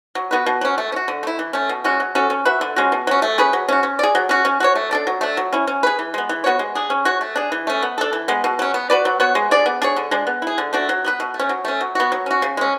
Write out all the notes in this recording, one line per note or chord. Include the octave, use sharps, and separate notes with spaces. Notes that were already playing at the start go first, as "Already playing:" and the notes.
F#3
B3 F#4 B4
B2
F#3 C#4
A3
C#4
F#4
D3
A3 E4
E3
A3 C#4
B2
G#3 C#4 F#4
F#3
C#4 F#4 A4
C#4
F#4 B4 E5
D3
G#3 C#4 F#4
B2
F#3 C#4
A3
C#4 G#4 B4
F#3
C#4 F#4
C#4
G#4 D5
F#3
C#4 F#4
C#4
F#4 A4 C#5
A3
D4 A4 D5
F#3
A3 D4
F#3
C#4 E4
C#4
G#4 B4
E3
G#3 B3
E3
B3 F#4 C#5
G#3
D4 G#4
C#4
F#4 C#5
A3
D4 G#4
E3
A3 C#4
B3
D4 A4
E3
G#3 B3
B2
F#3 C#4
B3
F#4 B4 D5
F#3
B3 F#4 C#5
G#3
D4 G#4 D5
B3
D4 G#4 C#5
D3
G#3 D4
B3
E4 G#4
D3
A3 D4 F#4
F#3
B3 F#4 B4
B2
A3
C#4
F#3
A3 C#4
F#3
B3 F#4
F#3
C#4 F#4
C#3
G#3 C#4